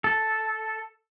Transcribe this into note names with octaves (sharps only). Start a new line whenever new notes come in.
A4